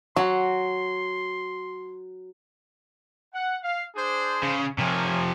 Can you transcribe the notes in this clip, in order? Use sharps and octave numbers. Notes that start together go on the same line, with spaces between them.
F#3 F#4 C6
F#5
F5
D4 G#4 C5
C#3
C3 F3 A#4 C#5 G#5